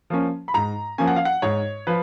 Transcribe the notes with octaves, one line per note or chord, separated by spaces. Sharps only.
F3 A#3 C#4
B5
G#2 A#5
F3 A#3 C#4 G#5
F#5
F5
F#5
G#2 C#5
F3 B4